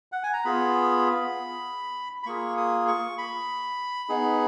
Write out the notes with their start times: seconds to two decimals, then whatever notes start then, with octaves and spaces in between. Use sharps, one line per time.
0.12 F#5
0.23 G#5
0.33 A#5
0.44 B3 F4 G#4 B5
2.23 B5
2.26 A#3 F4 G#4 C#6
2.57 D#6
2.88 C#6
3.18 B5
4.09 B3 D#4 G#4